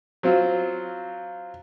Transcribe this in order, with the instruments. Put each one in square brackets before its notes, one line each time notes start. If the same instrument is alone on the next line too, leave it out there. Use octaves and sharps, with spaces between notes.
[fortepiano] F#3 C4 F4